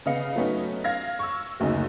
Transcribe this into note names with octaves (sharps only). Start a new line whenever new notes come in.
C#3 B3 D#5 F5 C#7
F#3 A3 B3 C#4 D#4
F5 F6 G#6 A#6
C#6 E6
F#1 D2 C#3 C#4 D#4